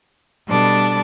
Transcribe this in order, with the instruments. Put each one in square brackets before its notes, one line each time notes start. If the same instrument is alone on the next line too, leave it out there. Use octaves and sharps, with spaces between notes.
[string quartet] B2 G3 D4 A4 D5